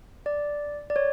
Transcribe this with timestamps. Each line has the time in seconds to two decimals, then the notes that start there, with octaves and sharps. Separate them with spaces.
0.26 D5
0.90 D5
0.96 C#5